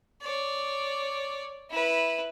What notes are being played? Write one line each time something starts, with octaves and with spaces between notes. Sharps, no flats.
C#5 D5
E4 B4